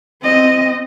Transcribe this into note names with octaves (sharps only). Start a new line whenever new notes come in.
C4 D#5